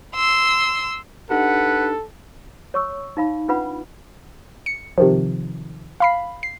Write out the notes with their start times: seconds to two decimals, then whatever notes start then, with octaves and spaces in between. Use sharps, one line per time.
0.15 C6 E6
1.30 D4 D#4 G4 A4 B4 F#5
2.74 C#5 C#6 E6
3.17 D#4 F5 B5
3.48 C#4 D4 F4 B4 F#5 B5
4.66 C#7
4.98 C3 D#3 F3
6.00 F5 B5 C7
6.43 C7